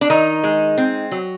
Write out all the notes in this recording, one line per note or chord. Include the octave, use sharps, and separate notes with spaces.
D4
D#3 D#4
G#3
C4
F#3